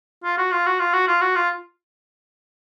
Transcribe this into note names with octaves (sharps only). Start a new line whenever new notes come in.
F4
F#4
F4
F#4
F4
F#4
F4
F#4
F4